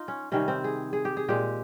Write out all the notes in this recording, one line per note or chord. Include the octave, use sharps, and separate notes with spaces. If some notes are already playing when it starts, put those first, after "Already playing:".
Already playing: D#4 F4
C#4
C3 D#3 G3 C#4
C4
G#4
G#4
G4
G#4
A#2 G#3 G4